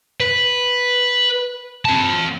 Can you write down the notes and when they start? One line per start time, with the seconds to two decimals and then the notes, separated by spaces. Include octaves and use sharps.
0.21 B4
1.85 C4 A5